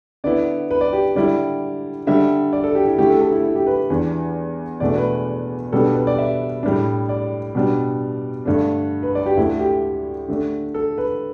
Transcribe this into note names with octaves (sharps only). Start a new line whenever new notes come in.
D3 B3 E4 D5
B4
D5
G4
D3 G3 E4 D5
D3 G3 D4 E5
D5
A4
G4
E4
D3 A3 E4 G4
A4
A4
E4
E4
G4
B4
E2 E3 B3 D4
E2 B2 A3 D4 D5
B4
B2 G3 B3 D4 A4
B4
D5
E5
A2 G3 D4
D5
B2 G3 D4
G2 D3 A3 D4
B4
D5
G4
D2 D3 A3 E4
G4
D3 A3 D4
A4
B4